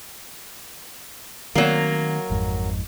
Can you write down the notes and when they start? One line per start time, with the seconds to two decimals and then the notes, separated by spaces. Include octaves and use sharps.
1.55 D#3 F#3 A3 A#3 C4
2.30 G#1 F2 G#2